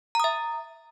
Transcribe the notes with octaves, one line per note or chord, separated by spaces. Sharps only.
E5 A#5 D#6